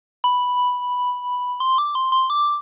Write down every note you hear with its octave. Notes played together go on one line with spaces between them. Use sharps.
B5
C6
D6
C6
C6
D6